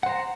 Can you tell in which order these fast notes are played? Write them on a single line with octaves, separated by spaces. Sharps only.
F#5 C5 A#5